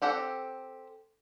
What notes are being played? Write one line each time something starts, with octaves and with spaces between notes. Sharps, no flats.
C4 G4 A4 F#5